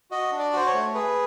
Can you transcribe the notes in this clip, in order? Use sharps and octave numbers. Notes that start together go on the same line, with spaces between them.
F#4 D#5
D4
D5
F#4 C5
C#5
A3
G#4 B4